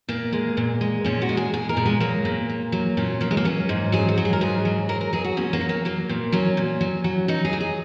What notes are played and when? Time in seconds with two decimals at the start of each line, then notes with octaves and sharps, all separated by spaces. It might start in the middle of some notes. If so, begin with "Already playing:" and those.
0.08 A#2 A#3
0.32 G#3
0.57 A#2
0.81 G#3
1.04 A#2 C#4
1.22 F#4
1.29 G#3
1.37 G#4
1.53 A#2 G#4
1.69 A#4
1.77 A#2
1.86 G#3
2.00 F#3 A#3
2.25 A#2
2.49 A#2
2.72 F#3
2.97 A#2 C#4
3.21 F#3 A#3
3.31 G#3
3.37 A#3
3.45 F#3 C#4
3.69 G#2
3.92 F#3 G#4
4.09 F#4
4.18 F#3
4.25 G#4
4.33 A#4
4.41 G#2 G#4
4.65 F#3
4.89 F#3 A#4
5.01 A#4
5.13 F#3 G#4
5.24 F#4
5.37 A#2 C#4
5.53 A#3
5.61 F#3
5.69 A#3
5.85 F#3 A#3
6.09 A#2
6.32 F#3 C#4
6.57 A#2
6.81 F#3
7.04 F#3
7.28 F#3 D#4
7.45 G#4
7.53 F#3
7.61 G#4